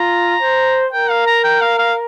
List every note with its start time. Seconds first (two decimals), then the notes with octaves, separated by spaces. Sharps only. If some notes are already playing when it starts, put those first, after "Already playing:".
Already playing: F4 A#5
0.41 C5
0.92 A#4 G5
1.10 F5
1.27 A#5
1.44 G5
1.61 F5
1.79 F5